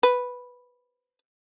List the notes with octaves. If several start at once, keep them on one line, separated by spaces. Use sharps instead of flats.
B4